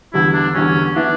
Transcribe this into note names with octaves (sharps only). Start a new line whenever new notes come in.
E2 D3 G3 E4
D4
E2 D3 G3 C#4
E3 B3 D4 E4